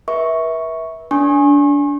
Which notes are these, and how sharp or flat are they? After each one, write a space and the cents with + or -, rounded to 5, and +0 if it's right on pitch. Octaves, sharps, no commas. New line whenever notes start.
B4 -40 E5 -20 C#6 +0
D4 -25 G#5 +0 C#6 -35